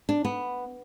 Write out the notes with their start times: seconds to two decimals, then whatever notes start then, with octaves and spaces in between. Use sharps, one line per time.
0.09 D4
0.25 B3